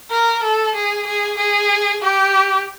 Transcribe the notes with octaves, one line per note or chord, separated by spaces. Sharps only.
A#4
A4
G#4
G#4
G#4
G4